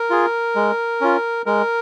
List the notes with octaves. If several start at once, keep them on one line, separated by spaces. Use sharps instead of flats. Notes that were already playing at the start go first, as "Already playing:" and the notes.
Already playing: A#4
F4 G#4
G#3
C#4 F4
G#3 A#4